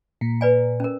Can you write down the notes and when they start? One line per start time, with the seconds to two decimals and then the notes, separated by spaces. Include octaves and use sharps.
0.21 A#2
0.41 B4 D5 G#5
0.80 C#4 A#4